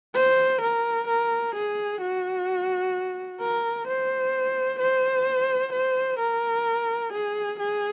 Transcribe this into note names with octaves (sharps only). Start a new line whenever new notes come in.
C5
A#4
A#4
G#4
F#4
A#4
C5
C5
C5
A#4
G#4
G#4